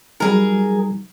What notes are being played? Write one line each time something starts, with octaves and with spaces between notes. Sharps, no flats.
F#3 G3 D#4 G#4 A#4